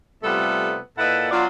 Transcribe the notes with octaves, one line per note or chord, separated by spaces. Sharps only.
C3 G3 A3 B3 F4 A4
A#2 E4 A4 B4 D#5 F#5
F#3 B3 D4 F4